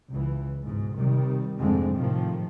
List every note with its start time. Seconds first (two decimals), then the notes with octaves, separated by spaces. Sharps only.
0.11 C#2 E3
0.64 G#2 B2
0.95 C3 D#3 G3
1.59 G#1 F2 D3 G#3 A3 C4
1.95 A2 C3 D#3 F3